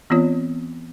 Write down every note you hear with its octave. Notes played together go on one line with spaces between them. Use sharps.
E3 B3 C4 F4 C#5